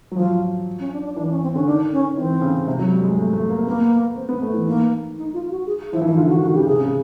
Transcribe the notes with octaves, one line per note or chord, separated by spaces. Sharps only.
F#3
F3 F4
C#4
D4
D4
E3 D4
C#4
C4
D3 C#4
D#3 D4
C#4
E3 C4
C#3
C3
F#3
G3
G#3
A3
A3
A#3
A#3 B3
C4
B3
A3
E3
D#3 A#3
D#4
F4
F#4
G#4
F3 E4
E3
D#3 E4
D3 F4
D#3 F#4
D#3 F#4
C#3 G4
C3 G#4
C#3